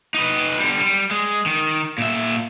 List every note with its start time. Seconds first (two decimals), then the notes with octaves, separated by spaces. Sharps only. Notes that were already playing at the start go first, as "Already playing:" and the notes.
0.14 D#4 B4
0.60 D3 G3
0.80 G3
1.11 G#3
1.46 D#3
1.98 A#2 E5